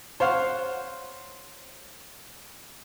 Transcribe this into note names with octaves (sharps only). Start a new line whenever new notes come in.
C5 C#5 F5 F#5